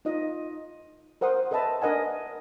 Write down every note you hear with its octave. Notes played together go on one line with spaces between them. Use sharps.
D#4 F4 D#5
A#4 C5 F#5 C6 D#6
A4 B4 D#5 E5 A5 B5
D4 A#4 D#5 F#5 G#5